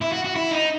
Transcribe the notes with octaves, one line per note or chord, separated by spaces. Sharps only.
E4
F#4
F#4
E4
D#4